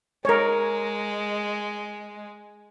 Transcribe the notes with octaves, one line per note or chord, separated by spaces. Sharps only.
G#3 A#4 C#5